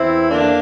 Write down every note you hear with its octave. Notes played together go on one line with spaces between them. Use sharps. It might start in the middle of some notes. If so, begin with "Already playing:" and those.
Already playing: E2 C4 E4
D3 A#3 D4